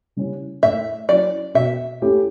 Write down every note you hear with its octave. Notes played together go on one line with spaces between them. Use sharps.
C#3 G3 C#4 E4
A2 E5
F#3 C#4 E4 D5
B2 E5
A3 C#4 E4 G4